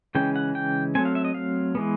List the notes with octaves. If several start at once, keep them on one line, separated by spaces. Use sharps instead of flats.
C#3 E3 G#3 C#4 G5
F#5
G5
F#3 A3 C4 G#5
F5
E5
D#5
F5
E3 G#3 B3